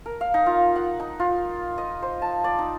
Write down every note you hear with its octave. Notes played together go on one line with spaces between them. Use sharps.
A#4
F5
D#4
F4
F#5
D#4
F4
D#5
C5
A5
D5
D#4